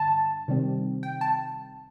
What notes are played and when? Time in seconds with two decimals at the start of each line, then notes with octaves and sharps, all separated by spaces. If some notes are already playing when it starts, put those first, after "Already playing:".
Already playing: G2 D3 A5
0.48 C3 D#3 G3 C4
1.03 G5
1.21 A5